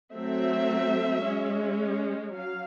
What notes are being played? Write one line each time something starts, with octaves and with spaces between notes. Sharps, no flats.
F#3 A3 C4 E5
G#3 C#4
F#3 F5